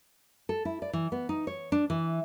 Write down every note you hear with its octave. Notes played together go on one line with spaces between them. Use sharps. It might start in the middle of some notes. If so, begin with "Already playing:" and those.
A4
E4
D5
E3
B3
D#4
C#5
D4
E3